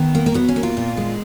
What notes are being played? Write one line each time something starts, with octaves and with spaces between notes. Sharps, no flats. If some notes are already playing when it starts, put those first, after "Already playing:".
Already playing: D#3 B3
A#3
A#3
F#3 B3
C#4
A#3
F4
A#2
G#3